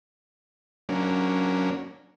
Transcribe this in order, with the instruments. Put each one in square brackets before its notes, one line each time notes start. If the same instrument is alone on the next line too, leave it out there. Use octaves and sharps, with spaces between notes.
[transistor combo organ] F#3 A#3 C#4 D4